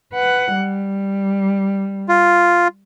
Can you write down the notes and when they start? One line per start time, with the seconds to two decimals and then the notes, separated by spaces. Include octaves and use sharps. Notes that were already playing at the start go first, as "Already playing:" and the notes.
0.14 B4 F#5
0.54 G3
2.08 F4